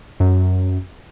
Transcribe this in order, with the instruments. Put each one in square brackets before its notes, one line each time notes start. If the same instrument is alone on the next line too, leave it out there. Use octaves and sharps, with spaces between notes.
[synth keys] F#2